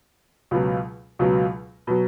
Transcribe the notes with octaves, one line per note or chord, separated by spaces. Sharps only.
C#2 B2 F#3
C#2 B2 F#3
B2 F#3